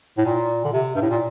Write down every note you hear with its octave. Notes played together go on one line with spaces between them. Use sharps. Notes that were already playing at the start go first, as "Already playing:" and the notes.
A2
A#2
D3
C3
G2
A2
A#2